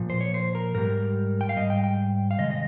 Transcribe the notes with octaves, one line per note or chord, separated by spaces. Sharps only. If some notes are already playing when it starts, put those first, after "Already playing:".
Already playing: A#2 F3
C5
C#5
C5
A#4
G#2 G3 A#4
G5
F5
G#2 G3 D#5
G5
G5
F5
C3 D#3 G#3 D#5
D#5